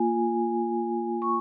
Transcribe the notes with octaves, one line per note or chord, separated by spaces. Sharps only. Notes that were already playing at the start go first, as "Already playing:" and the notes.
Already playing: A#3 F4 G#5
C#6